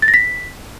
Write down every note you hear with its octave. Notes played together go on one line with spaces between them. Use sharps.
A6
A#6
B6